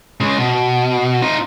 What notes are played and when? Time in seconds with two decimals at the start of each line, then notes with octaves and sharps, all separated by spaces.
0.21 C#3 G#3
0.38 B2
1.22 D#4 F4